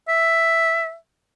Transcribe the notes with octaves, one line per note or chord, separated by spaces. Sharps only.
E5